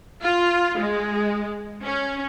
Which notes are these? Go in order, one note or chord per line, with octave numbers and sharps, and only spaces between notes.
F4
G#3
C#4